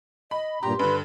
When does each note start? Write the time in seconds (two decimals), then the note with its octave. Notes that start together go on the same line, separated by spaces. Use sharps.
0.31 D#5 B5
0.63 G2 A#2 G4 A#5 C6
0.79 G2 D3 B4